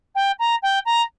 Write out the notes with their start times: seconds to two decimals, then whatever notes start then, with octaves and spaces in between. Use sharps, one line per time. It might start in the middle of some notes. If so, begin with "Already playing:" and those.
0.15 G5
0.39 A#5
0.62 G5
0.85 A#5